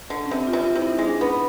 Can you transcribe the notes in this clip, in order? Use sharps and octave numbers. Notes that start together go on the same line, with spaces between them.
D3
C#4
C3 C4
F4
C3
F4
C3 E4
D#4
G#3
D4
B3 C#4